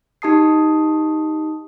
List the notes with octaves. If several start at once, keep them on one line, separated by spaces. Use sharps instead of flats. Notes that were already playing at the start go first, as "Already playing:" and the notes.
D#4 G4 A5 D#6 C7